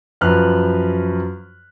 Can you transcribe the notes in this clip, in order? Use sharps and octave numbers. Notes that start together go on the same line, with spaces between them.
F#2 F3 B4 F6 F#6